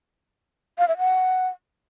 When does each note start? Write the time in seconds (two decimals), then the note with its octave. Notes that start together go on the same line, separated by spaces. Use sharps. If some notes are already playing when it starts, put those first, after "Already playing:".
0.79 F5
0.88 E5
0.98 F#5